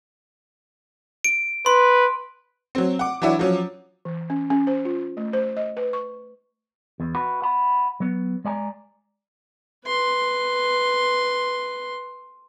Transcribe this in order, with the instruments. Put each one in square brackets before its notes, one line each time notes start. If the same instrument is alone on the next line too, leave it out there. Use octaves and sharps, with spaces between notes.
[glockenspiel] D7
[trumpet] B4 [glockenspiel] C6
[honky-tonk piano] F#3 C4
F#5 D6
E3 F#3 D4 E4 F#4
F3 F#3 C#4
[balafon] E3
C#4
C#4
C5
F4
A3
C5
D#5
B4
C#6
[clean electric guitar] E2
F#4 B4
F#5 B5
F#3 B3
G#3 D5 G#5 A#5
[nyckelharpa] B4 C6